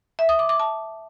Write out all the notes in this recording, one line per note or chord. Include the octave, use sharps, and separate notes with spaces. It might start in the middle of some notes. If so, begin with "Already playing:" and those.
E5
D#6
D6
D6
A5